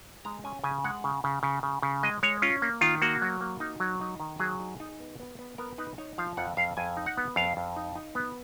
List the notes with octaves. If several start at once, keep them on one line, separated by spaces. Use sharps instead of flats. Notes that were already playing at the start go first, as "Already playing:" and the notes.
G#3 A#5
C#4 G#5
C#3 G#5
G#3 F#5
C#3
C#3
C#3
C#3
C#3
G#3 D#5
G#3 C#5
C#4 F4
A#3
D#3 F4
A#3 F#4
F#3
A#3
D#4
F#3
D#4
D#3
F#3 G#4
D#4
D#4
B3
B3
B3
B3 A#4
D#4 B4
D#4 C#5
F3 F5
F2 F#5
F2 F5
F2 G#5
D#4
F#5
B3
F2 F5
F2
D#4
D#4
B3